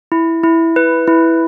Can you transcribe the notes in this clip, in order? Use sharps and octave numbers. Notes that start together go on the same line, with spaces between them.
E4
E4
B4
E4